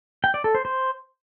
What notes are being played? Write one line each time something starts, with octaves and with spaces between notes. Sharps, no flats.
G5
D5
A4
C5
C5